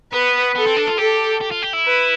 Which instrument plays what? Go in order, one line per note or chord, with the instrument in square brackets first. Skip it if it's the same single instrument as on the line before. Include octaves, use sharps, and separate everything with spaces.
[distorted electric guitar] B3 [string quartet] B4
[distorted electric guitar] B3 [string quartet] A4
[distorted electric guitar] C4
D4
F4
[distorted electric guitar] G4 [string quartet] A4
[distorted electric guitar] G4
F4
G4
E4
[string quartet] B4